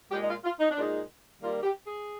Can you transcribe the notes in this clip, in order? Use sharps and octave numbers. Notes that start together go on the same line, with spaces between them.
A#2 G#3 G4
D#4
F4
F4
D#4
D4
A#2 G#3 D#4
D#3 G3 A#3 F4
G4
G#4